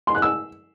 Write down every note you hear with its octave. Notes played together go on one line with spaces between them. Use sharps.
C6
F#6
E6